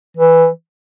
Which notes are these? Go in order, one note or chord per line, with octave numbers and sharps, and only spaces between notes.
E3